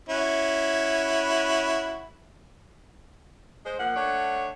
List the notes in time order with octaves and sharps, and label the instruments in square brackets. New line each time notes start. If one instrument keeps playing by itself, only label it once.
[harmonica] C#4 E4 F#4
[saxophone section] G#3 C5
[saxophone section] F3 A#3 [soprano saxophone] F#5
[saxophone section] A3 D4 C#5